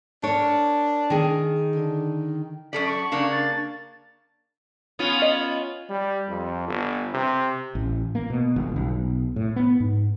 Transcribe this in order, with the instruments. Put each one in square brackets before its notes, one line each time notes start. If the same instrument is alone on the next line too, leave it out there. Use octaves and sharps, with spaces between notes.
[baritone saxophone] D4 [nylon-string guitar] A#4 C#5
[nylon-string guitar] D#3 G#4
[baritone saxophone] D3
[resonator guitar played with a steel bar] F#2 A4 D5 [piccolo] B6
[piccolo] C#6
[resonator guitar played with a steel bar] C#3 A#3 D4
[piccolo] A6
[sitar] B3 C#4 F4
[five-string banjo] D#5
[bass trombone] G3
F2
G1
C3
[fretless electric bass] A1
A#3
B2
G1
B1
A2
B3
G#2